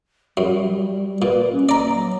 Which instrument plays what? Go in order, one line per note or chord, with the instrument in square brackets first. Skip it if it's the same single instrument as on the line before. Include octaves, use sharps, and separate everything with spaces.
[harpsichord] F#2 [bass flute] G3
[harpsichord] A#2 [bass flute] B4
[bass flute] C#4
[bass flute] A#3 [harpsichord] D5 A#5
[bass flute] F#3